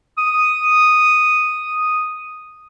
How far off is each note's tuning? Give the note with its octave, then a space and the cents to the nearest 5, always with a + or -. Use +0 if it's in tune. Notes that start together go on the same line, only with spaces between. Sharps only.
D#6 -5